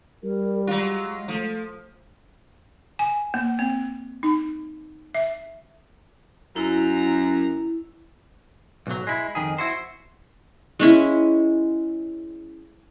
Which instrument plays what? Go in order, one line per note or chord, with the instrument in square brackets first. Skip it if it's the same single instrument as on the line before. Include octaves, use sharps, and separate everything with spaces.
[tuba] G3 [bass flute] A#4
[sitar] F#3 F4 [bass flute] G#3
[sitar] F3 [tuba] A3
[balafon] G#5
A#3
C4
D#4
E5
[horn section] F#2 A#5 [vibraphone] E4
[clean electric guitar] B1 G#2 F#3
G#3 E4
F2 D#3 G#4
E4 F#4 C5
[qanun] G#3 C#4 E4